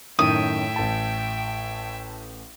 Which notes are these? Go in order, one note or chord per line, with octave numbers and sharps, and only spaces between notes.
F#2 A2 D#3 E5 G5 D#6
A1 A5